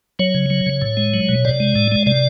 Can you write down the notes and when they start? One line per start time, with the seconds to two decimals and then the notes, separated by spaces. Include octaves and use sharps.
0.19 F#3 C#5
0.34 C#3
0.50 F#3
0.66 C#3
0.82 A2
0.97 G#3
1.14 F#3
1.29 B2
1.45 C3 D5
1.60 G#3
1.75 A2
1.92 G#3
2.06 C3 D5